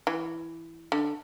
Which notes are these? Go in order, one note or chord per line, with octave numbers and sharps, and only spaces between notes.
E3
D3